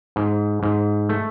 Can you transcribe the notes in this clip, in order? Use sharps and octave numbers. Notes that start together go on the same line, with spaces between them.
G#2
G#2
A3